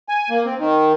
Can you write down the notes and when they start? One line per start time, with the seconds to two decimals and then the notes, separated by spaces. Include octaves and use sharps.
0.09 G#5
0.30 A#3
0.45 C4
0.58 D#3